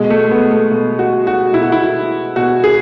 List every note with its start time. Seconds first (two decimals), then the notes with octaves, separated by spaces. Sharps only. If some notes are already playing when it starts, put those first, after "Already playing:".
Already playing: B2 G#3
0.10 A3
0.31 B3
0.51 A3
0.71 B2
0.99 F#4
1.27 F#4
1.53 B2 E4
1.63 F#4
1.72 E4
2.36 B2 F#4
2.64 G#4